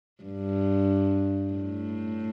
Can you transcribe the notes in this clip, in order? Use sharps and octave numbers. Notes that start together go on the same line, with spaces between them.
G2
A2